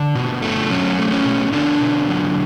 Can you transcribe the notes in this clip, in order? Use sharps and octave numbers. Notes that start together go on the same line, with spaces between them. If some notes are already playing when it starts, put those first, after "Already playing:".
Already playing: D3 D4
B2
A3
F#3 C#4
A3
C#4
B2
B2 D3 D4
B2
F#3